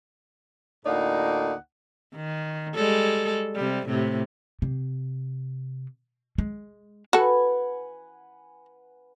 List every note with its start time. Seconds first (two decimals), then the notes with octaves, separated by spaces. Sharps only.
0.86 D2 A2 A#3 D#4 D5 F#5
2.16 D#3
2.75 G3 G#3 A4
3.55 C3 G3
3.87 A2 C3
4.62 C3
6.38 G#3
7.13 F#4 A4 B4 F#5 G#5